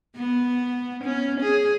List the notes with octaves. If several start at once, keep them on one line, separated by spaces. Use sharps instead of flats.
B3
C#4
G#4